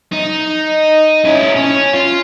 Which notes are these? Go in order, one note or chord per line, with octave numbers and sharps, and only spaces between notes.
D#4
C#4 E4
C#4
F4